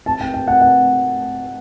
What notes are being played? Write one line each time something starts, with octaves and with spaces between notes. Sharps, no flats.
A5
G5
G5
F#5
F#5